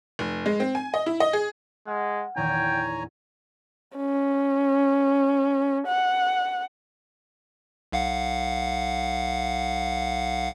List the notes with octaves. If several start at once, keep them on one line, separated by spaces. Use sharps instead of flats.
F1
G#3
C4
G#5
D#5
E4
D#5
G#4
G#3 F#5 A5 F6
E2 A#2 D#3 C#5 G5 G#5 A#5
C#4
F#5
B1 F5 F#5